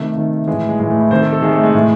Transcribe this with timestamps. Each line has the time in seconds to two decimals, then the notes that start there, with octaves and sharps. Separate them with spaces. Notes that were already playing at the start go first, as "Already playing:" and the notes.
Already playing: C3 D#3 A3
0.15 C3 D#3
0.48 E3 G#3
0.52 A2
0.69 G#3
0.80 A2 G#3
0.82 E3
0.90 A3
1.00 E4
1.11 C3 D#3 C5
1.22 A4
1.33 A4
1.42 C3 D#3 G#4
1.53 A3
1.63 G#3
1.74 A2 E3